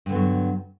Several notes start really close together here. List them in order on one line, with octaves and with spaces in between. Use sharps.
G2 D3 B3 F#3